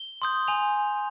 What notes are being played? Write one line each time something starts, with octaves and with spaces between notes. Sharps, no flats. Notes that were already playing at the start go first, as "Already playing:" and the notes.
Already playing: G7
C6 D#6 G6
G#5 F7